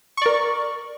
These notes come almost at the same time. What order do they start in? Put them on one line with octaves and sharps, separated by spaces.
C#6 D5 A#4